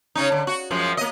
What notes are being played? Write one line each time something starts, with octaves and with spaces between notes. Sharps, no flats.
C#3 C#4 D#4
D3
F#4
F#2 F3 G#3
A#3 D#5